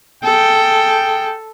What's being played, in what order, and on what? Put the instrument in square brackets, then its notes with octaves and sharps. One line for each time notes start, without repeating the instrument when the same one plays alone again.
[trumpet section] G#4 G5 [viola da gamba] A4